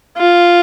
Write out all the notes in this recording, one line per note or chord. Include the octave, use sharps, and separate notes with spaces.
F4